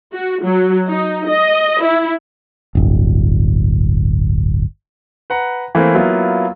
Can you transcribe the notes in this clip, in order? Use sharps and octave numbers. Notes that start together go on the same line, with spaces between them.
F#4
F#3
D#4
D#5
E4
D1 G1
B4 F#5 A#5
E3 A3 A#3 C4 E4
F#3 A#3 B3 E4 F4